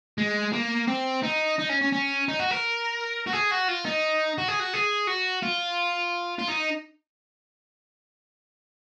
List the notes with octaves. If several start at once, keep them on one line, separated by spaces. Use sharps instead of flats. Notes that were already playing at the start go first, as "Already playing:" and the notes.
G#3
A#3
C4
D#4
D#4
C#4
C#4
C#4
D#4
F#4
A#4
F#4
G#4
F#4
F4
D#4
F#4
G#4
F#4
G#4
F#4
F4
F4
D#4